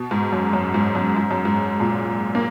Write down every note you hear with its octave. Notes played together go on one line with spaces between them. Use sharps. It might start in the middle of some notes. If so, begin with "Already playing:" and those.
Already playing: B2
G#2
F#2
F#2
G#2
F#2
G#2
F#2
G#2
A#2
A#3